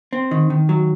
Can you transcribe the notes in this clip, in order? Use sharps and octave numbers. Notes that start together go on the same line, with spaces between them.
C4
D#3
D#3
F#3